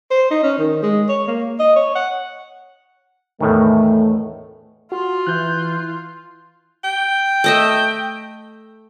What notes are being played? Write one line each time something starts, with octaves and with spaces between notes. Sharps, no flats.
C5
D#4
C#4
D#3
G#3
C#5
A#3
D#5
C#5
F#5
E2 A2 D#3 A3
F4 F#4
E3 F#6 G6
G5
A3 D#5 E5